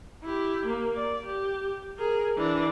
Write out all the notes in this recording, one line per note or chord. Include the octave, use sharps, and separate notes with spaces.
E4 G4
A#3
D5
G4
G#4 A#4
E3 D4